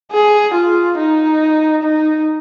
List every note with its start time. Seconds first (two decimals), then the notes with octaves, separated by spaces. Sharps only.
0.12 G#4
0.54 F4
0.98 D#4
1.83 D#4